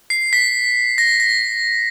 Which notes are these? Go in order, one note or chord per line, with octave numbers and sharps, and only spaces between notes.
C7
B6
A#6
A#6